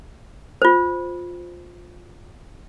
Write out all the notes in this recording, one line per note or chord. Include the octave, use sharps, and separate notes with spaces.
F4 C5